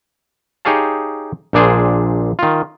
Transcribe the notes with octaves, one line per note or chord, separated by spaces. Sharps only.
D#4 G4 G#4 C#5 F5 A5
A#1 A#2 D4 G#4 C5
D#3 F4